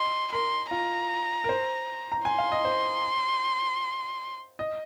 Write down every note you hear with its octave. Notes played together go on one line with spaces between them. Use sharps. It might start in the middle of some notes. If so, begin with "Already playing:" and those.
Already playing: D#5 C6
A#4 C6
F4 A#5
A#4
C5
A#5
G#5 C6
F5
D#5
C5
D#5